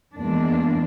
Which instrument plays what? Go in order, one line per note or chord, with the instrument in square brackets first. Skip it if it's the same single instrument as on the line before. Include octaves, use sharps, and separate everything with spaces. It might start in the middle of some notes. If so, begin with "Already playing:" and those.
[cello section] E2 G#3 A#3 D4